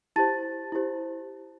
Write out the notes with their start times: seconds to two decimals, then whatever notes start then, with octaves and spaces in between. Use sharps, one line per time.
0.16 E4 G4 C5 A5 A6
0.72 E4 G4 C5